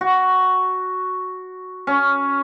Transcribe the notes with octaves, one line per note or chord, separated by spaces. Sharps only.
F#4
C#4